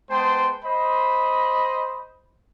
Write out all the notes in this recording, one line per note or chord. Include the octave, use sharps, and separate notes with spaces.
G#3 B3 C5 G5 A5 C6
C5 D#5 B5